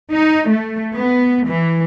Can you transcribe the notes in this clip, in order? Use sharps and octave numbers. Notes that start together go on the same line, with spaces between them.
D#4
A3
B3
E3